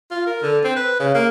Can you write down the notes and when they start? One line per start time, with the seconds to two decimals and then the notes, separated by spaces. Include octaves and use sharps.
0.11 F4
0.26 A#4
0.42 D3
0.64 C4
0.76 B4
1.00 C#3
1.14 A#3